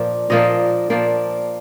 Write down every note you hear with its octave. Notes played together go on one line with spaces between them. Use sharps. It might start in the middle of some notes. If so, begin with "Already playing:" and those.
Already playing: A#2 F3 A#3 D4
A#2 F3 A#3 D4 D#5
A#2 F3 A#3 D4